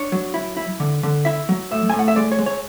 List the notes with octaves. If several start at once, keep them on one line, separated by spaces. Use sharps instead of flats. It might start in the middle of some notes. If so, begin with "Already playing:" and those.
Already playing: D4 C#5
F#3
E4
E4
D3
D3
E4 E5
F#3
A2 E5
A2 G#5
F#5
E5
G#3 D5
C#5
G#3
C#5